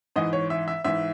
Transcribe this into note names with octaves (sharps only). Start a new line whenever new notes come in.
G#2 E3 D#5
C#5
E5
E5
G#2 E3 E5